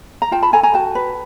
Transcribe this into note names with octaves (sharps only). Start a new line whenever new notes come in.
A#5
F4 G5 A5
A5 B5
A4 G#5 A#5
G#5 A#5
F#4 G5 A5
B4